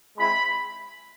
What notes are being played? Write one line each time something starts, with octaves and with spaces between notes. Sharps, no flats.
G#3 C4 E4 B5